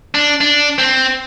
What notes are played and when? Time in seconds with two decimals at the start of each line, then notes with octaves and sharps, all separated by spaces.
0.15 D4
0.41 D4
0.78 C4